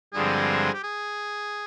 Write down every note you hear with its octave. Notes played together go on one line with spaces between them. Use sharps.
G2 D3 F3 G#3 C4 G#4
G4
G#4